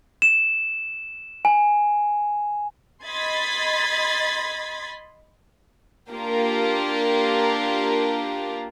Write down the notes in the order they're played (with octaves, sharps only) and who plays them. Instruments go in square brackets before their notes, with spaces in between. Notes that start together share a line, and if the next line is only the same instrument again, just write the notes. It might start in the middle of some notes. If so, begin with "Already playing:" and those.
[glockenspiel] E7
G#5
[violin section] D#5 B5 C6 G#6 A6 B6
A#3 D4 F4 G4 A#4